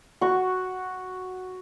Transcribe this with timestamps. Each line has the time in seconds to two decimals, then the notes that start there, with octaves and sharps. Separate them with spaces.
0.21 F#4 C#6